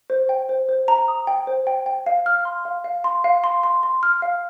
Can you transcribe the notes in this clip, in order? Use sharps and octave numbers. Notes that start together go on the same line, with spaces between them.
C5
G5
C5
C5
A#5
D#6
G5
C5
G5
G5
F5
F6
C6
F5
F5
C6
F5
C6
C6
C6
F6
F5